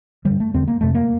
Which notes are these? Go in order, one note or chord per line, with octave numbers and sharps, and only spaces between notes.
D3 G3
G2
A3
E2 D3 C4
A#3
F2 C3 A3
A#3